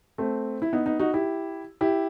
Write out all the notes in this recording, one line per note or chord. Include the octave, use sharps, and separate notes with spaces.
A3 C4
E4
B3 D#4
B3 D#4
D#4 F#4
E4 G4
E4 G4